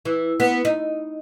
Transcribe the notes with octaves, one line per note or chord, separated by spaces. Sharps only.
E3
B3
D#4